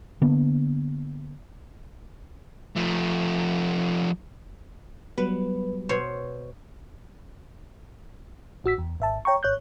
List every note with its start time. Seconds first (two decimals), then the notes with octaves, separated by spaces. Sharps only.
0.21 D3 A#3 B3 D4
2.76 F3 A3
5.18 F#3 G3 B3 B4
5.89 B2 C5 C#5
8.64 A1 F#4 E6 B6
8.78 E2
9.00 G#1 E5 A5
9.25 C#5 G5 A#5 C#6
9.43 G#1 C#5 F#6 G6